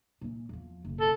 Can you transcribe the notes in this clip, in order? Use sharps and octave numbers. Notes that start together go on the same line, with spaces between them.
A#2 E3
E2 F3
F#1 B1
A4